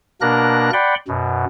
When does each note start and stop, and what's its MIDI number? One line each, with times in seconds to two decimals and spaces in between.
0.21 0.70 47
0.21 0.70 58
0.21 0.70 62
0.21 0.70 70
0.21 0.70 90
0.21 0.70 94
0.73 0.95 74
0.73 0.95 78
0.73 0.95 79
0.73 0.95 83
0.73 0.95 84
1.08 1.45 42
1.08 1.45 47